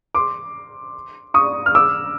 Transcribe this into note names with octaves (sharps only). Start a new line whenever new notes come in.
C6 D6
C#6 D#6
F6
D6 E6